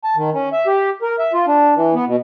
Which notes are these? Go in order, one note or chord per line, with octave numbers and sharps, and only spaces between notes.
A5
D#3
C#4
E5
G4
A#4
E5
F4
D4
E3
B3
B2